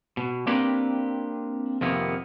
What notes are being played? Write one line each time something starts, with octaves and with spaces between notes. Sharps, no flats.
B2
A#3 C4 D4 G4 A#4 B4
F2 C3 D#3 A#3 B3